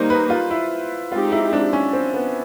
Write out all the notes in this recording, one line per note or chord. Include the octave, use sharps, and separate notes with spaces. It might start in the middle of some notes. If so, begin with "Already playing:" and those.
Already playing: D#3 G3 A#3 D#4 C5
B4
F4
E4
G#3 C4 D#4 F4 G4
E4
D4
C#4
C4
B3